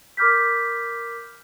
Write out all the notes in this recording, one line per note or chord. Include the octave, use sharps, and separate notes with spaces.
A#4 B5 D6 F6 G6 B6